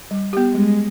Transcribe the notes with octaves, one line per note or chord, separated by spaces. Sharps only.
G3
B3 G4
G3 G#3